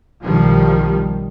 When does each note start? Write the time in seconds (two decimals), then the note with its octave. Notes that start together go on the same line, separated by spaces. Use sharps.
0.23 B1 D#3 F3 G3